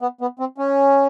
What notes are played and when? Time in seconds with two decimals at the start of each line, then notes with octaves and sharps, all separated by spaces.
0.01 B3
0.21 B3
0.39 C4
0.58 C#4